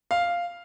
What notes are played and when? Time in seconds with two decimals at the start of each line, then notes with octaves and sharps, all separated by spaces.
0.11 F5